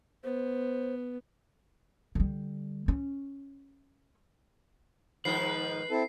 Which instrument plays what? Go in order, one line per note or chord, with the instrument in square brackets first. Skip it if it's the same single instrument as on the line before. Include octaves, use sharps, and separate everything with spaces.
[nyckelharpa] B3 [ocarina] C5
[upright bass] D3 G3
C#4
[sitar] G#2 D#3 F3 [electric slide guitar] B4 [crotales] C7
[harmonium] C4 E4 A4